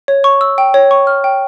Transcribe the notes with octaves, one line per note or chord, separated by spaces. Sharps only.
C#5
C#6
E6
G5
C#5
C#6
F6
G5